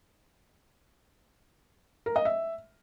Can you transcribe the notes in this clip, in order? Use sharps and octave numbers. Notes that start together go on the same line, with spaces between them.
A#4
D#5
E5